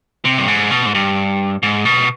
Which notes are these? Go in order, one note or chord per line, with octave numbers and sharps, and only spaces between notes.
C3
G2
G#2
B2
G#2
G2
G#2
B2